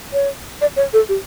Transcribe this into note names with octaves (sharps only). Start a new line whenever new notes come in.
C#5
D5
C#5
A4
G4